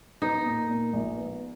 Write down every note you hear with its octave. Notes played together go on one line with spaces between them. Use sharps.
B3 D#4
A#2
A#2
A#1
B3